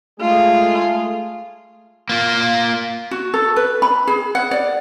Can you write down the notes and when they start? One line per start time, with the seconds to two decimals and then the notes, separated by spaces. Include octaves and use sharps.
0.20 G#3 A3 F4 G#4
2.09 A#3 F4
3.11 F#4
3.34 A4
3.56 B4
3.82 B5
4.07 G#4
4.35 F#5
4.51 D5